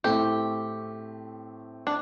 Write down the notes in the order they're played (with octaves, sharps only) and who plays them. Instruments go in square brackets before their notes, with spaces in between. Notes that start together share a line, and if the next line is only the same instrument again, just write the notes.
[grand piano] A2 A3 C4 [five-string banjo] G4
[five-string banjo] D4